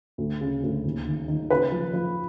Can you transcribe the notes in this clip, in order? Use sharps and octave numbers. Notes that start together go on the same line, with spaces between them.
D2
C#3
D2
D#2
D#3
D#3
C#3 B4 B5
F3
F3